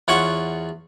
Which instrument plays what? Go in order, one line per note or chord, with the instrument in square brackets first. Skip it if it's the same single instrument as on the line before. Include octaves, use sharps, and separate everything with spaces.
[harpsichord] E2 F4 C#5 F#5 C#6